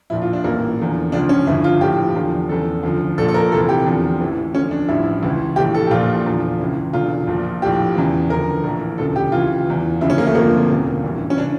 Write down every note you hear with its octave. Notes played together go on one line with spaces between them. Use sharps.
A#1 A#2 F3 E4
F4
D4
A1 G2 E3 A#3
E2 D3 F3
C#2 C#3 F3 D4
C#4
G1 G2 F3 E4
F4
A#1 A2 F3 G4
E2 D3 F3
E2 C#3 F3 A4
D2 C#3 F3
A#1 A#2 F3 A4
A4
A#4
F1 F2 E3 A4
G4
E2 D3 F3
A1 A2 E3
D2 D3 F3 C#4
D4
A1 G2 F3 E4
C#2 C#3 E3
A#1 A2 E3 G4
A4
G4
A#1 A#2 F3 F4
E2 D3 F3
C#2 C#3 E3
E1 E2 D3 F4
A#1 A#2 F3
A#1 A2 F3 G4
E2 C#3 E3
D2 D3 F3 A#4
A#1 A2 E3
E1 D2 C#3 F3 A4
G4
C#2 C#3 E3 F4
E2 E3
D2 C#3 F3 E4
C#4
A#3
A3
G1 F2 D3 F3 A#3
E1 D2 C#3
A1 G2 E3
C#4
C#3 E3 D4